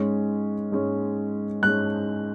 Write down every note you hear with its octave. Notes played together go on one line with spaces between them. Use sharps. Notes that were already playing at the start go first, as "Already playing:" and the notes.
Already playing: G#2 G#3 C#4
G#2 G#3 C#4
G#2 G#3 C#4 F#6